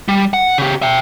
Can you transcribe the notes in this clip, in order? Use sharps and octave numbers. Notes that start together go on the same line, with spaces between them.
G3
F#5
C#3 G4
E5 G5